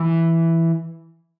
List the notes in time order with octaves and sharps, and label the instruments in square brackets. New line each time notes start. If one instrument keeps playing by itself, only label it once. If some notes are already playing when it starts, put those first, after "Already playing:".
Already playing: [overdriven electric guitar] E3